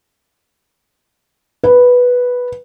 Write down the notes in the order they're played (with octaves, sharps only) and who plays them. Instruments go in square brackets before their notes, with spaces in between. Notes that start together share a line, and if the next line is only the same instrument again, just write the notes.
[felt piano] B4